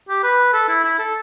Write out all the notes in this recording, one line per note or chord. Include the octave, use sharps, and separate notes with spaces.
G4
B4
A4
E4
E4
A4